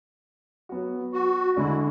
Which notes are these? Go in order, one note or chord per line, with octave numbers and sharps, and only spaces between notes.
F#3 B3 F#4
F#4
D3 G#3 D4 E4